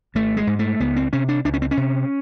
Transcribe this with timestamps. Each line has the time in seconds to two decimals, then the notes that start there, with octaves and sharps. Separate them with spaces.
0.15 G#1 A3
0.37 G#3
0.47 G#2
0.59 A3
0.80 C#2 B3
0.96 C4
1.13 C3 C#4
1.29 D4
1.45 C#2 D4
1.54 C#4
1.62 C4
1.71 C#4
1.77 C3